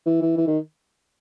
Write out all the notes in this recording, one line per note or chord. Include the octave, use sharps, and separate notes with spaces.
E3
E3
E3
D#3